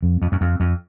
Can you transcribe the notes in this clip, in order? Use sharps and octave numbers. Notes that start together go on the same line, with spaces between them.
F2
F2
F#2
F2
F2